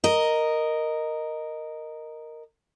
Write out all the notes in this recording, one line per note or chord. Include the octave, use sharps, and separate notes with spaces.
A#4 D#5